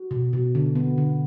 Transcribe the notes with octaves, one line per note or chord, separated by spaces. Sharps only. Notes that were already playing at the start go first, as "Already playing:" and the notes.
Already playing: F#4
B2
B2
D3
B3
D3